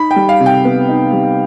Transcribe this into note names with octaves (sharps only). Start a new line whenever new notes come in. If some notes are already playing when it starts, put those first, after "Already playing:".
Already playing: D#4 B5
G5
G3
F5
C3
G5
B3
D#4
G3